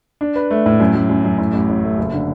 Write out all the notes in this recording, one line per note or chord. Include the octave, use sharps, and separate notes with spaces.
D4
B4
A3
A2
F#2
F#2
F#2
F#2
A2
A1
A1
A3
F#1
D3